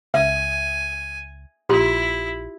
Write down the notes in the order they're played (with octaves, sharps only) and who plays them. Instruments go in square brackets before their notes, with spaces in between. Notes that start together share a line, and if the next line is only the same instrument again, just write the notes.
[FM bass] C#2 [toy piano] E5 [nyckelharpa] G#5
[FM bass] A#1 [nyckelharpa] E4 [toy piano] F4 G4 C6